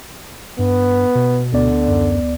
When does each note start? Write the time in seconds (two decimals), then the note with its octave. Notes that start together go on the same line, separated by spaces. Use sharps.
0.59 G2 B3
1.15 B2
1.53 D2 D3 B3 D5
1.88 F#2